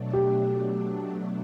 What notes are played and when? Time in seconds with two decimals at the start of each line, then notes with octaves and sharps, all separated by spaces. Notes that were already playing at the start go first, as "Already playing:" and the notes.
Already playing: B2 F#3 A3 D4
0.13 G4